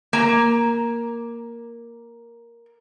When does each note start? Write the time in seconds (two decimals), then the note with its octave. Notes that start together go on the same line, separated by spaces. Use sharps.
0.13 A#3 A#5